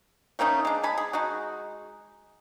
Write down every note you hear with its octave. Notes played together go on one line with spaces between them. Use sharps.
A3 A#3 C#4 D#4
G#3 D4
G#5 A5 B5
G#4
G#3 D#4 F#4